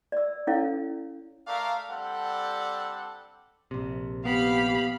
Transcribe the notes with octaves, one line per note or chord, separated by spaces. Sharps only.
D5 E6
C#4 E4 A4 C#5 F5
A3 A#4 D5 F5
G3 C4 D4 A4 F#5
A#1 C3
B3 G4 F5 B5